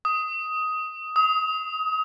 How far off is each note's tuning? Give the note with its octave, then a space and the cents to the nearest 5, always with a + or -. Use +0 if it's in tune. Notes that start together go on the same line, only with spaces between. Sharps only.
D#6 +10
D#6 +35